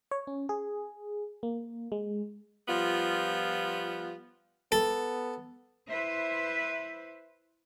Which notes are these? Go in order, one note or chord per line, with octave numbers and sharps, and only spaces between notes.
C#5
C#4
G#4
A#3
G#3
F3 G3 B3 F4
B3 A4
E4 B4 C5 E5